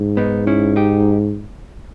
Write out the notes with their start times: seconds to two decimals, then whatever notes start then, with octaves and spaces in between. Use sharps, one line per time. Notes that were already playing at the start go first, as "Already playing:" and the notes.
Already playing: G#2
0.17 B3 D#4
0.47 C#4 E4
0.76 D#4 G4